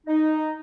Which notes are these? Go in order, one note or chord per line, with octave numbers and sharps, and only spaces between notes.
D#4